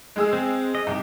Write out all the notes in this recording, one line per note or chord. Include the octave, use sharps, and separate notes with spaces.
G#3 G#4 E6
C4
D#5
C2 D#4 G4